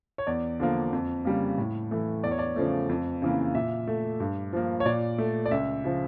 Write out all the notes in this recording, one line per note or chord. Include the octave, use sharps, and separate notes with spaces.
C#5
E2 D5
D3 F3 A#3
F2
C#3 G3 A#3
A2
E3 A3
E2 D5
C#5
D5
C#3 F3 A3
F2
C#3 E3 A#3
A#2 E5
A3
G2
F3 A#3
C#5
A#2 D5
A3
D5
C#2 E5
C#3 F3